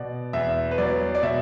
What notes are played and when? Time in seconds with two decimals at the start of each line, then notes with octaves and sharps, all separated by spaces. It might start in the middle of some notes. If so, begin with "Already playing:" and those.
Already playing: B2 D5
0.33 E2 E5
0.71 B4
0.78 F#3 D5
1.15 D5
1.23 B2 E5